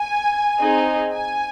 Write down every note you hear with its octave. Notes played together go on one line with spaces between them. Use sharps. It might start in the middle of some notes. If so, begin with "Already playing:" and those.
Already playing: G#5
C4 D#4 G#4
G#5